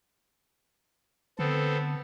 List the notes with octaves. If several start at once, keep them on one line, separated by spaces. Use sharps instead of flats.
D3 B3 C4 A4